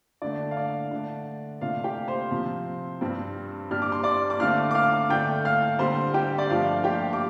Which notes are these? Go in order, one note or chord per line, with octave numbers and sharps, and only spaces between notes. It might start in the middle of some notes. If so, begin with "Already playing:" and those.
D3 A3 D4 D5
F5
D5
D3 A3 D4
C3 A3 D4 F4 F5
G4 G5
C5 C6
C3 F3 C4
G2 G3 C4
G2 G3 D4 F6
D6
C6
D5 D6
D6
D3 A3 C4 F5 F6
D6
F5 F6
D3 A3 D4 G5 G6
F5 F6
D3 G3 C4 C5 C6
G4 G5
D5
G2 F3 A3 D4 F4 F5
G4 G5
D6